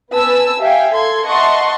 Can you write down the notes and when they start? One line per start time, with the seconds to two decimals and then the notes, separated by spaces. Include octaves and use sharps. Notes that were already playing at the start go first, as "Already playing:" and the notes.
0.12 B3 B4 G#5 A5 E6
0.60 G4 E5 F5 G5 G#5
0.93 A4 C6 G#6
1.26 D#5 E5 F#5 A5 C6 C#6